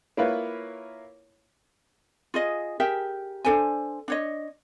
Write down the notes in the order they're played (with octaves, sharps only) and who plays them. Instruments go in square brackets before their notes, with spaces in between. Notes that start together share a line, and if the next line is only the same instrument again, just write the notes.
[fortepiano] A#3 E4 F4 B4 C#5
[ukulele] F4 G#4 D#5
G4 G#4 A#4 E5
D4 A4 C5 G#5
D4 C#5 D#5